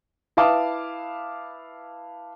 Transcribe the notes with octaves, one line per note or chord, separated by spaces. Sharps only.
E4 B4 F5 A5 D6 D#6